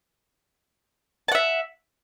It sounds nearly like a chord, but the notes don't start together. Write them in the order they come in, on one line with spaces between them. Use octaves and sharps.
A5 F#5 E5